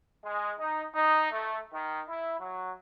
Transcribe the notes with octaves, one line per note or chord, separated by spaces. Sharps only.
G#3
D#4
D#4
A3
D#3
E4
F#3